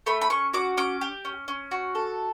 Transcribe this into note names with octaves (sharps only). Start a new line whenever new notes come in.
A3 B5
B5
C#4 C#6
F#4 D6
C#4 D6
G4
C#4
C#4
F#4
A4